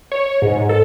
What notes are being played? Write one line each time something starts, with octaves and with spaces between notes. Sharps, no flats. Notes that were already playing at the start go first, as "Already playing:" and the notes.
C#5
G#2
A4